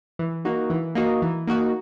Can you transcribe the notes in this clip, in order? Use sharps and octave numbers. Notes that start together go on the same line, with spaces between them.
E3
A#3 D#4 F#4
E3
A#3 D#4 F#4
E3
A#3 D#4 F#4